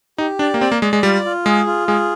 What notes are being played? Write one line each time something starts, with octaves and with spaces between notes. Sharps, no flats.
D#4 G4
D4 D5
A#3
C4 D5
A#3
G#3 D5
G#3
G3 F4
F4
G#3 G#4
F4
G#3 G#4